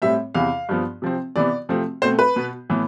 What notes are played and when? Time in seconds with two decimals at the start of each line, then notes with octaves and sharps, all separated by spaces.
0.02 A2 G3 C4 E5
0.35 E2 C3 E3 F5
0.69 G2 F3 B3
1.02 C3 F3 C4
1.36 C3 E3 B3 D5
1.69 C3 F3 A3 C4
2.02 B2 A3 C4 C5
2.19 B4
2.36 B2 B3
2.70 A2 E3 B3